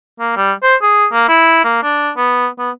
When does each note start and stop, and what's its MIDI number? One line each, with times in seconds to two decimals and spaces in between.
0.20 0.36 58
0.36 0.53 55
0.63 0.75 72
0.82 1.06 68
1.12 1.26 58
1.29 1.62 64
1.64 1.82 58
1.83 2.11 62
2.17 2.48 59
2.58 2.71 59